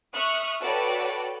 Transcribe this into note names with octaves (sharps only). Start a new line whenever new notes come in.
E5 C#6 D#6 F6 F#6
F#4 A4 B4 C#5 D5 G5